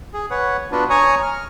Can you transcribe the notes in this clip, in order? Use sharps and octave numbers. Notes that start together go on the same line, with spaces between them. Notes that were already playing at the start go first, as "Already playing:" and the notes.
G#4
B4 C#5 F#5
B3 D4 F4 F#4 B4
C#5 G#5 A#5 C#6 D#6
F6